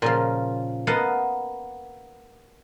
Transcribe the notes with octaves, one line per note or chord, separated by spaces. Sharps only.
A#2 C#3 F3
A#3 B3 D#5 F5 F#5 A5